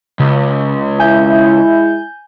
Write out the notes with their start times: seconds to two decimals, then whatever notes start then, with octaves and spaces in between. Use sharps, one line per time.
0.20 C#2 C#3
0.99 G#3 E4 G#5 G6